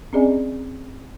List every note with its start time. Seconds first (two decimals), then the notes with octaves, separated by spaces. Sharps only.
0.13 C4 C#4 G#4 D5 D#5 G#5